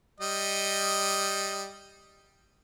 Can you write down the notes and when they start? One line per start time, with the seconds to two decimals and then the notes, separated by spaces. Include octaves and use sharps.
0.20 G3 D#5